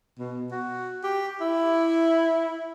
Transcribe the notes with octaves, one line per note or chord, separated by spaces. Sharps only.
B2
F#4
G4
E4